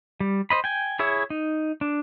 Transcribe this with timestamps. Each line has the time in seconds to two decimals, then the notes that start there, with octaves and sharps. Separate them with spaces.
0.20 G3
0.50 C5 D#5 B5
0.64 G5 G#5
0.99 E4 G#4 C#5 E5
1.30 D#4
1.81 D4